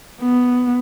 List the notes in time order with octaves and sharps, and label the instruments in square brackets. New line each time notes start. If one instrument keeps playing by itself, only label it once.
[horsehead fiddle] B3